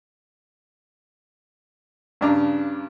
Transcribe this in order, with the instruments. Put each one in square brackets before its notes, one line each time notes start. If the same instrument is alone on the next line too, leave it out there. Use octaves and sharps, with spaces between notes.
[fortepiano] G2 C#3 D4 A#5